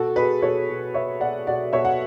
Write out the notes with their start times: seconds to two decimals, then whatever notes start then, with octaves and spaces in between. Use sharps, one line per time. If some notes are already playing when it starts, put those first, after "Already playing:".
Already playing: B2 F#4 A4
0.16 B2 G#4 B4
0.42 B2 A4 C#5
0.69 B2
0.94 B2 C#5 E5
1.20 B2 D5 F#5
1.47 B2 D5 F#5
1.73 B2 C#5 E5
1.85 F#5